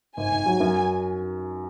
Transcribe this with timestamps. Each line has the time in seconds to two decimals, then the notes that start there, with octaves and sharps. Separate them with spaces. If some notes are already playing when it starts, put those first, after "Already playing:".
0.17 G#1 G#5
0.31 G#1
0.46 F#3
0.60 F#2